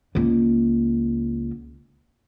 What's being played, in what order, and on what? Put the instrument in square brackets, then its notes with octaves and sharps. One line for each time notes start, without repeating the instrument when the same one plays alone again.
[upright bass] C#2 A#3